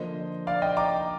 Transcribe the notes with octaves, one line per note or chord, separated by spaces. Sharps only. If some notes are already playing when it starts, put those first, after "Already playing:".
Already playing: D3 F3 A#3 C5 D#5
D5 F5
D#5 G5
A#5 D6